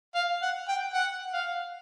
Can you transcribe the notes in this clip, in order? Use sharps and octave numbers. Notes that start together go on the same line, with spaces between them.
F5
F#5
G5
F#5
F5